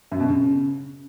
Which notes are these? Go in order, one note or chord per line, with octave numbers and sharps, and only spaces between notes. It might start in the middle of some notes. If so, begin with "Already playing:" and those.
F#2
B2
C#3